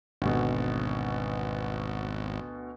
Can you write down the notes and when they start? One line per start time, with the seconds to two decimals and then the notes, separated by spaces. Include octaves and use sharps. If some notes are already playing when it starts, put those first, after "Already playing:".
0.22 G#1 D2 B2